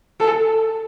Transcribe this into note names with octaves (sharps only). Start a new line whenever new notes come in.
A4